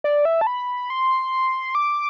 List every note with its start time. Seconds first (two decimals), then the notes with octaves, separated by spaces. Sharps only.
0.04 D5
0.25 E5
0.41 A5
0.47 B5
0.90 C6
1.75 D6